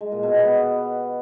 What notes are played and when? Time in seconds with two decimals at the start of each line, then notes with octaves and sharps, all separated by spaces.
0.01 G#3
0.12 A#2
0.23 B2
0.34 B3
0.45 B3